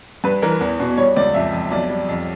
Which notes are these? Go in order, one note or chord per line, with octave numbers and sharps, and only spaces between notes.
G2 B4
E3 A#4
E2
B2
G3 C#5
C#2 D5
F2 E5
F2
B1 D5
G3
F2